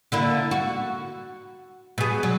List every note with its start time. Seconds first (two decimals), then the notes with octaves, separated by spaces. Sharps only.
0.12 D3 A#3 E4
0.51 F#4
1.98 B2 G#4
2.23 F#3